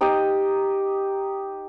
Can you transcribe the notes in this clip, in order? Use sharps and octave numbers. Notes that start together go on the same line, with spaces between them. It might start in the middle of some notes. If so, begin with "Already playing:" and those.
D#4 G4 D#5